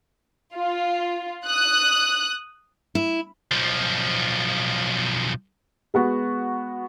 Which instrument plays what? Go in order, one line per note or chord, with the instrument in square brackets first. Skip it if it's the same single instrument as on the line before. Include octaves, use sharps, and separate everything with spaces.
[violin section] F4
D#6 F#6
[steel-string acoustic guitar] E4
[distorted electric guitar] B1 F3
[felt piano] G#3 B3 F#4